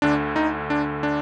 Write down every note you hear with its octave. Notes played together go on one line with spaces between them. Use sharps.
D2 D3 D4
D#4
D4
D4